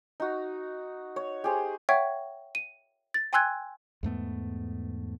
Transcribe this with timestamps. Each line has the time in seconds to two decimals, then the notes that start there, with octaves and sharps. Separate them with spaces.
0.20 D#4 F#4
1.16 C#5
1.44 G4 G#4 C5
1.89 C#5 E5 F#5 G5 C#6 G#6
2.55 D#7
3.14 A6
3.33 G5 G#5 C6 E6 F#6 G#6
4.03 E2 G#2 A3 B3